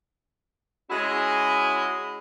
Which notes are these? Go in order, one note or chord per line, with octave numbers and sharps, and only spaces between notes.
G#3 C#4 E4 F#4 G#4